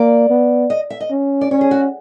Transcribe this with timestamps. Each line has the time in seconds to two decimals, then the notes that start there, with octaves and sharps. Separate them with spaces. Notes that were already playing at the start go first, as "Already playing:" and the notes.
Already playing: A#3 D5
0.30 B3
0.70 D#5
0.90 E5
1.00 D#5
1.11 C#4
1.41 D5
1.51 C#4 C#5
1.61 G#4
1.71 F#4